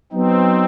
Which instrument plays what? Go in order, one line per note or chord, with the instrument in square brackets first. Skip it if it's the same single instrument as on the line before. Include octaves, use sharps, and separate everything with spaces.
[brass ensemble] F#3 B3 D#4 [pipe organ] C4